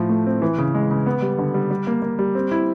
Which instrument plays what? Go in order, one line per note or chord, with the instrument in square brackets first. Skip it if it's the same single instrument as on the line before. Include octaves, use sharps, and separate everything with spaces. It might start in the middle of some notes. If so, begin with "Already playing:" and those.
Already playing: [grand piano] A2 F3
A3
C4
E3
C#3
G#3
C#3
B3
G3
D3
G3
G3
A#3
A#3
G3
C4
E4